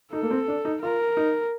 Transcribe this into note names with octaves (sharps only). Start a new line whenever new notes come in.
D#4 A4
A#3
C4
D4
D#4
F4 A#4
D#4